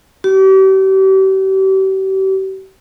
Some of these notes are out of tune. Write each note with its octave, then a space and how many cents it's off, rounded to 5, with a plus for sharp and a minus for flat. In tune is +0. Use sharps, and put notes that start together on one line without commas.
G4 -40